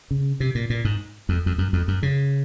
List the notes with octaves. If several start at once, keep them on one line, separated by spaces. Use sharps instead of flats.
C#3
C3
A#2
A#2
G#2
F2
F2
F#2
F2
F#2
C#3